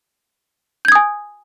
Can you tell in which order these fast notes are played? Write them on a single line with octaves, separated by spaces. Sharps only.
G6 G#6 D#6 G#5